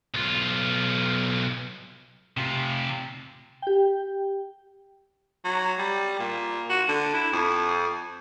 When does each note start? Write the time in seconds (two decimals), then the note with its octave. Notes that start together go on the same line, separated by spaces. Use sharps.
0.14 B1 F4
2.37 C3 F4
3.62 G4 G5
5.45 F#3
5.79 G3
6.20 A#2
6.70 F#4
6.88 D3
7.14 E4
7.32 F2